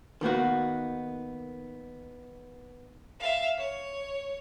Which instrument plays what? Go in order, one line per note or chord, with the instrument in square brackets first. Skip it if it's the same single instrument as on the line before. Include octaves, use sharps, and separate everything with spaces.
[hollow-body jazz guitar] D#3 A#3 B3 F#4
[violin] E5 F5
C#5